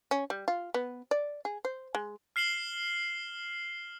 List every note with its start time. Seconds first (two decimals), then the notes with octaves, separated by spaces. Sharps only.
0.11 C#4
0.30 G3
0.48 F4
0.74 B3
1.11 D5
1.45 G#4
1.65 C5
1.95 G#3
2.36 F6 C7 E7 F#7 G7